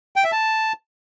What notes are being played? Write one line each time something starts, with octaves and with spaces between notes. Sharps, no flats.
G5
E5
A5